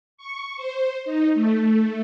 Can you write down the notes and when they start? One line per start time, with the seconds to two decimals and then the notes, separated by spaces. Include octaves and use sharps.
0.17 C#6
0.56 C5
1.05 D#4
1.34 A3